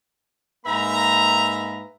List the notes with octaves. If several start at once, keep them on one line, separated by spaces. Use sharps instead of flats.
G#2 A#3 B4 E5 A#5